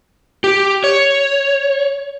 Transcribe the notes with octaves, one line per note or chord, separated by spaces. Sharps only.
G4
C#5